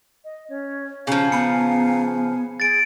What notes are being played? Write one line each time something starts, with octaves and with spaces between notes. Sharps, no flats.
D#5
C#4 C#5
C#3 F3 C#4 F5 G#5 A#5
B3 B5 C#7
G#5
G#4 A6 D7